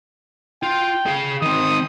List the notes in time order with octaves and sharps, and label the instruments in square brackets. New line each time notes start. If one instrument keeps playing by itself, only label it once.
[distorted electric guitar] F4 [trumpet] G5
[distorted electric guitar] G#4 F5
[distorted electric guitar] D#3 C4 [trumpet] D#6